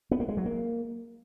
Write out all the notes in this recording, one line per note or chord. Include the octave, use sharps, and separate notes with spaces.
B3
A#3
G#3
F#3
A#3